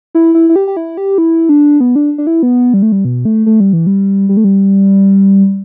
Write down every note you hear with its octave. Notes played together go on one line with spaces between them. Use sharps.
E4
E4
E4
G4
G4
E4
G4
E4
D4
B3
D4
D4
E4
B3
G3
A3
G3
B2
A3
A3
G3
E3
G3
G3
A3
G3